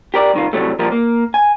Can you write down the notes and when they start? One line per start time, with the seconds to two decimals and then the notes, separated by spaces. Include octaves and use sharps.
0.14 G4 A#4 D5
0.34 C2 D#3 F4
0.53 A2 C3 F#3 G3 A3
0.79 A#2 F3 G3 A#3 A#4
0.92 A#3
1.34 G#5